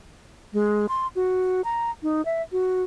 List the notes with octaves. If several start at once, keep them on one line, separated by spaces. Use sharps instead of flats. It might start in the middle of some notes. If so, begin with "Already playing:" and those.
G#3
C6
F#4
A#5
D#4
E5
F#4